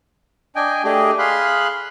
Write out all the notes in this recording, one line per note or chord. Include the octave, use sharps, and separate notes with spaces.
D4 D#5 G5 G#5
A3 D4 G4 G#4 D#5
G#4 F5 B5 C6 F#6